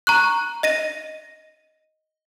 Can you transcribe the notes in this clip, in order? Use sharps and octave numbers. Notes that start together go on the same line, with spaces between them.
A#5 C#6 F#6
D#5 A#6 D#7